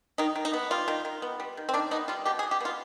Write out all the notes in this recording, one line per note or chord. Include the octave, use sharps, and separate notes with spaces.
D#3 D#4
D#3
D#4
B3
G3 F4
D#3
D#3
B3
G3
D#3
C4
D#3 D4
B3 D#4
G3 F4
B2 G4
G#4
B2
G4
B3 F4